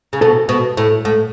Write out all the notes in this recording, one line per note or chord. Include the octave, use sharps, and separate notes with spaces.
C#3
B2 A4
B2
A2
A2